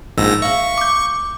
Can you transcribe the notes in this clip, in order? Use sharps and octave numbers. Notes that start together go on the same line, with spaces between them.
A#1 G#2 E6 A#6
E5 F5 C#6
D6 G6